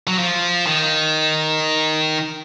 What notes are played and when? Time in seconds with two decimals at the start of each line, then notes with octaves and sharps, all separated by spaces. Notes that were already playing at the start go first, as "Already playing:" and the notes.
0.08 F#3
0.18 F3
0.66 D#3